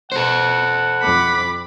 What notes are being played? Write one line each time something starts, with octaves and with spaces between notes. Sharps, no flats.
B2 A4 C5 F#5
F2 B5 D6